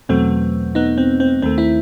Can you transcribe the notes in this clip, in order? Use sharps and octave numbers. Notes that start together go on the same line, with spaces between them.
E2 B2 F#3 A3 C4
B3 D#4
C4
C4
D#2 D#3 A3 C4
C4 E4